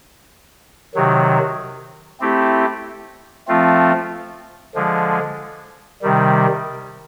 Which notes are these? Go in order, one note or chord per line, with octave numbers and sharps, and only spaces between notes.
C3 D#3 F#3
A3 C4 E4 G4
F3 A3 C4 F4
D3 F3 G#3
C3 D#3 G3